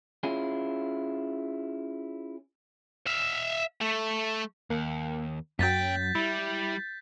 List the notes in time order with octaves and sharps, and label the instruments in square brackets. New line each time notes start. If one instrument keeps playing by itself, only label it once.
[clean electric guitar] C#4 E4 F4 G#4
[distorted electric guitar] E5 F5
A3
[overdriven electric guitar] D#2 [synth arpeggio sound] A#3
[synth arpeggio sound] F#2 F#3 [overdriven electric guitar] A#2 G5 [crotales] G6 A6 B6
[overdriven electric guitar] G3 [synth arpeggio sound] E4